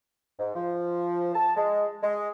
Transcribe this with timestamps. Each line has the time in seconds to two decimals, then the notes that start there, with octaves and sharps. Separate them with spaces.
0.40 G#2
0.56 F3
1.35 A5
1.57 G#3
2.03 G#3